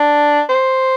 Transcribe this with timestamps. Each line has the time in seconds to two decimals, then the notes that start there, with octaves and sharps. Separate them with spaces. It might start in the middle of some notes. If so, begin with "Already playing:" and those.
Already playing: D4
0.49 C5